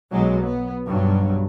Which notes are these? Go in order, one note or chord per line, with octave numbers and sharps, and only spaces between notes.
B1 F#3 G#3
B3
B1 G2 F#3